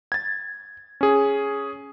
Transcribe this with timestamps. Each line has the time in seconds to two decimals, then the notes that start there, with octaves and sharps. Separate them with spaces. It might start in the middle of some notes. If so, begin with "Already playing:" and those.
0.12 G#6 A6
1.01 C#4 G#4